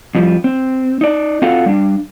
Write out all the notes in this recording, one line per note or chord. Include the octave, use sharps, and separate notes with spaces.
F2 F3 G3
C4
D#4 D5
C4 F4 F#4 A4 F5 F#5
G3 D4